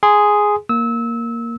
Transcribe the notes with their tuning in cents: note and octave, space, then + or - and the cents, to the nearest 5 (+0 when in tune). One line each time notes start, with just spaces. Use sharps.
G#4 +0 C6 -15
A#3 +0 E6 -25